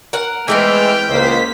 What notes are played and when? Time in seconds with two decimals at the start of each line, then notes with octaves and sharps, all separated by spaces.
0.13 A#4 F#5
0.48 E3 G#3 A3 B3 C4 B4 G5 F6
1.09 C#2 A#3 C5 B6